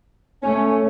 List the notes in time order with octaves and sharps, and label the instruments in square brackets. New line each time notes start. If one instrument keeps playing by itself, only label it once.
[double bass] A3 [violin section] C#4